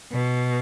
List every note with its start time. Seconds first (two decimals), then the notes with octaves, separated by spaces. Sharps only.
0.13 B2